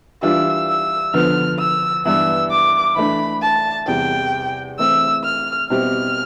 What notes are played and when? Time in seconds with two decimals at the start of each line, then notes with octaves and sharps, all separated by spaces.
0.23 E3 G3 D4 F4 E6
0.68 E6
1.14 D3 F3 B3 F6
1.59 E6
2.05 G2 E3 B3 E6
2.51 D6
2.96 E3 A3 D4 B5
3.42 A5
3.87 E2 C3 G3 G5
4.79 E3 A3 C4 E6
5.24 F6
5.70 B2 G3 C4 E4 G4 F6